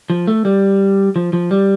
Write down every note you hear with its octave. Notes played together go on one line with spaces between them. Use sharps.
F3
A3
G3
F3
F3
G3